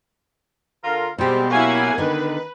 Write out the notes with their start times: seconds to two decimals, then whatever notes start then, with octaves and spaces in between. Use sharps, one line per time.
0.84 D3 F4 A#4
1.18 B2 G3 G#3 C4 G4
1.51 F#3 A#3 C#4 E4 F#5 G#5
1.98 D3 D#3 D#4 B4